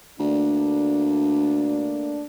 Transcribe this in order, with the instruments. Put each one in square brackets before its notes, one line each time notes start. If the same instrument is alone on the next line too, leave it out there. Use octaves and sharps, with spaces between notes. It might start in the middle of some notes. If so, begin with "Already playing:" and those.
[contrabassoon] D2 [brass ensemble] A3 A#3 D4